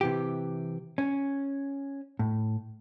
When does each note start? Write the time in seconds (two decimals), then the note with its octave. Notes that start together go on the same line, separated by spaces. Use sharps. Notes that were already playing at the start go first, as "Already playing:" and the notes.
0.01 C3 E3 G4
0.98 C#4
2.19 A2